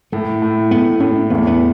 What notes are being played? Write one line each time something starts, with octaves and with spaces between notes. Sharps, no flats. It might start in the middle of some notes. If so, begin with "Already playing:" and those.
A2 A3
A2
A2 B3
A2 C#4
E2 B3
A3
B3